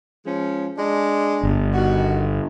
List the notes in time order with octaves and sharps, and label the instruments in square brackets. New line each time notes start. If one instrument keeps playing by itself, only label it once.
[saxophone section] F3 G#3 C#4
G#3 D4
[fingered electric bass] G1
[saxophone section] D#3 F#4